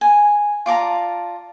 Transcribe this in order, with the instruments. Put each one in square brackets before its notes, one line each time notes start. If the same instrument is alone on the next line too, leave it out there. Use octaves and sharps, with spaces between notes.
[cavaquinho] G#5
F4 D5 A5 A#5